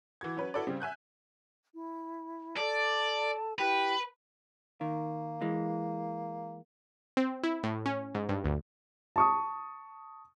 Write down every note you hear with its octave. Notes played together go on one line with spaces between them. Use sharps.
E3 F#4 G#6
F#3 C#4 B4
E4 F#4 A4 B4 D5
C#3 G3 C4
E5 G#5 F#6 G6
E4
A4 D5 A5
E4 G4 B4 G5
D#3 A#3
E3 G#3
C4
E4
A2
C#4
G#2
G2
D2
A5 C#6 D#6